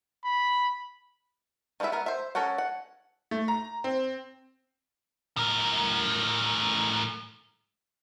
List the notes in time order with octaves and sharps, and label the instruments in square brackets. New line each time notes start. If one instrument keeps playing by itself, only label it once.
[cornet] B5
[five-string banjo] D#3 G#3 B3 E4 E5
B3 A#4
C5 E5
C#4 A4 A#4 C#5 F#5
F#5
[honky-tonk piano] A3
A#5
C4
[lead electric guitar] A2 A#4